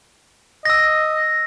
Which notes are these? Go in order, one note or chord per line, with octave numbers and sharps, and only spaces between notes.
D#5 E6 A#6